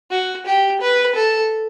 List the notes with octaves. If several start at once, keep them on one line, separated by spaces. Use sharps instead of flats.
F#4
G4
B4
A4